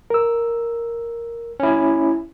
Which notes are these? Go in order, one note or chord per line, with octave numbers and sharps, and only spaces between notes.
A#4 E6
C#4 E4